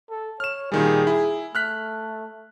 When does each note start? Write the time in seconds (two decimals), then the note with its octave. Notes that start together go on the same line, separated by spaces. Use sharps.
0.10 A4
0.40 C#5 F6 E7
0.72 A#2 D#3 G3 G#4
1.07 E4
1.55 A3 F6 F#6 B6